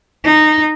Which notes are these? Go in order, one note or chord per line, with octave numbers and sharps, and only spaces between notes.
D#4